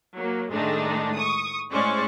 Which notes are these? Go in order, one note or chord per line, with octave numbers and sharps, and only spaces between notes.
F#3 A#3
A2 D#3 G#3 A3 D4 D#4
C#6 D#6
A2 G#3 C#4 C5 D5 C#6